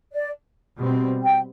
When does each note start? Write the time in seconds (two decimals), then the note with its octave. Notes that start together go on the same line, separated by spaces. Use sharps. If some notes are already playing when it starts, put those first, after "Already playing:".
0.13 D5
0.78 B2 G3 C4
1.22 G5